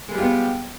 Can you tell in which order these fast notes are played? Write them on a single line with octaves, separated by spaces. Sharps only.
G#3 G3 G4 F4 B3